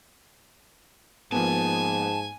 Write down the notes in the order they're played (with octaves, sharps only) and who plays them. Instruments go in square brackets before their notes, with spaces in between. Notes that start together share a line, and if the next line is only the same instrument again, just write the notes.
[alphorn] G#2 [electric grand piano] F3 A#3 B3 [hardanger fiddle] G#5 [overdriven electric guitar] A5